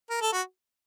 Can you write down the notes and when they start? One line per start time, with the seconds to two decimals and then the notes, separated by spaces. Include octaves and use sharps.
0.10 A#4
0.22 A4
0.33 F#4